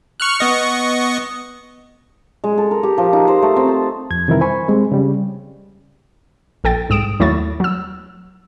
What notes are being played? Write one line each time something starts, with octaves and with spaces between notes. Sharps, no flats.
C#6 F6 F#6
B3 D#5 C#6
G#3
A4
A#4
G4
F3
D#4
C5
A3
C4
A5
F2 G#6
C3 D#3 E3 G3 E4 A#4
C5 G#5 B5 C#6
G3 G#3 C4
C#3 G3
A#1 A4 G5 A6
C2 G#2 D#6 D7 E7
D#2 F#3 A3 E4 C#6 A6
F#3 E6